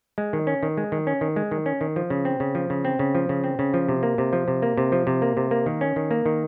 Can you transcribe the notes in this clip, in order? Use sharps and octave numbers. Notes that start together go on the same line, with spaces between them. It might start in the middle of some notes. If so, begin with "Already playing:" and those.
G#3
D#3
C#4
D#3
G#3
D#3
C#4
D#3
G#3
D#3
C#4
D#3
F3
C#3
C4
C#3
F3
C#3
C4
C#3
F3
C#3
C4
C#3
F3
C3
A#3
C3
F3
C3
A#3
C3
F3
C3
A#3
C3
A#3
D#3
C#4
D#3
A#3
D#3